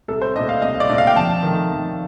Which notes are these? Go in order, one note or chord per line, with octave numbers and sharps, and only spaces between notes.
C2 A4
C5
A#2 A3 D4 D#5
F5
C2 D#5
D5
A#2 A3 D4
F5
G5
F2 A5
D#3 A3
F2